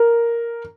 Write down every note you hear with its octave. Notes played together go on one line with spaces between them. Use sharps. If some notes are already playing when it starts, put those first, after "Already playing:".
Already playing: A#4